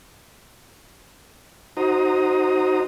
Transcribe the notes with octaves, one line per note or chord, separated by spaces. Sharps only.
D#4 F#4 C5 A#5 D#6